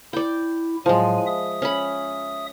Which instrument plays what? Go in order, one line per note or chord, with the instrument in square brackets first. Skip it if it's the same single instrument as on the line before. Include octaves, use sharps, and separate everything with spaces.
[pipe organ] E4 [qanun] D5 G5
[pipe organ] A2 F#3 G#5 [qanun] F3 G#3
[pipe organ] E5 D#6
[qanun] C#4 B5